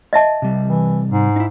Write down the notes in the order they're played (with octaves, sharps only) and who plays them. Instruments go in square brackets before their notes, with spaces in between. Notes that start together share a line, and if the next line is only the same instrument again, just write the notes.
[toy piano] D#5 E5 A5
[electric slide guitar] C3 G3
[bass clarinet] E3
G#2
[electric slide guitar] D#4 E4